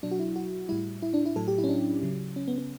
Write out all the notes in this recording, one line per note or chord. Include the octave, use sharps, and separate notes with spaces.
B2 F#3 D4
F#4
E4
F#4
A2 G3 E4
E4
D4
E4
A2 F#3 A4
G4
E4
C#4
D4
C#3 F#3
C#4
B3
B3